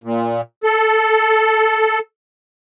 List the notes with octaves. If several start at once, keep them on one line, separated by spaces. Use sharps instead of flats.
A#2
A4